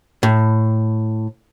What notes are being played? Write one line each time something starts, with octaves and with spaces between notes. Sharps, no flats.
A2